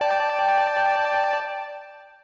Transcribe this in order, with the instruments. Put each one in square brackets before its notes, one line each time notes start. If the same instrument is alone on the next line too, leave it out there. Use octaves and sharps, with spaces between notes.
[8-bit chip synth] D5 A5 [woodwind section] G5